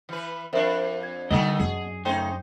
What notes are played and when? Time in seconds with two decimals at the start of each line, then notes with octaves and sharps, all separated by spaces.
0.09 E3 B4
0.53 F2 D4 A#4 C5 E5
1.03 G#6
1.31 B2 D3 D#3 G3 A3 D#4 D#5
1.60 F#2 G#4
2.05 C#3 A3 D#4 C5 G5